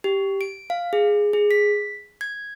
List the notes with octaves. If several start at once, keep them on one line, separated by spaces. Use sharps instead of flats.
G4
D7
F5
G#4
G#4
B6
G#6